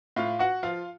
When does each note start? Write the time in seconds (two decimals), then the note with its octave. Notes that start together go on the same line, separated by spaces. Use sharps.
0.16 A2 F4 F5
0.39 F#4 F#5
0.63 F3 F4 F5